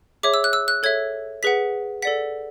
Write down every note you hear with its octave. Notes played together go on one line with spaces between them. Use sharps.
G#4 C#5 E5 D6
E6
F#6
E6
F#6
A4 C#5 E5 G#6
G#4 B4 F#5 B6
A4 D5 F#5 B6